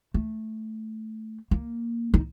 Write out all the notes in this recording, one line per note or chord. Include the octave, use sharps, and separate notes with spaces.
A3
A#3
D#4